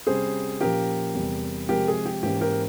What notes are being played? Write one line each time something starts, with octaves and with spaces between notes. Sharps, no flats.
C3 G3 C#4 G#4 C5
A#2 F3 A#3 C#4 G4 A#4
E2 C3 G3
C3 F3 G#3 G4 A#4
G#4
G4
G#2 E3 A#3 C#4 G4
G4 A#4